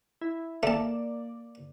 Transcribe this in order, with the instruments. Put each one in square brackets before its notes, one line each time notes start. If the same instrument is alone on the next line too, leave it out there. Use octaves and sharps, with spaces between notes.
[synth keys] E4
[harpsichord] A3 A5 [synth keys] A#3 D5